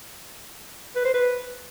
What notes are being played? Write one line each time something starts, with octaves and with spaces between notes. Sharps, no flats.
B4
C5
B4